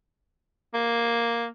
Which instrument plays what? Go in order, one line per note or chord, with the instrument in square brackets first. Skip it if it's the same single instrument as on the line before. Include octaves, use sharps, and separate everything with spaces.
[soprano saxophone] A#3